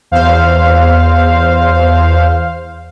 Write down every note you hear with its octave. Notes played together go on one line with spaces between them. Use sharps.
E2 C5 F5